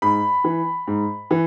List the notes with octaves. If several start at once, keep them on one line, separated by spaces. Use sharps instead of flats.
G#2 B5
E3
G#2
E3